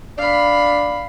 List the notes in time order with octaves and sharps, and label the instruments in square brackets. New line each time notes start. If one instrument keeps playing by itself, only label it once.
[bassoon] D4 [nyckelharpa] F5 B5